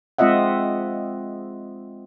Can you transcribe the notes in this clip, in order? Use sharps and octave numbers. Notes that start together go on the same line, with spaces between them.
G#3 C4 F4 D#5 E5 F#5